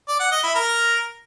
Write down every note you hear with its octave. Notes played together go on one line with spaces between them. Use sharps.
D5
F#5
D#5
E4
A#4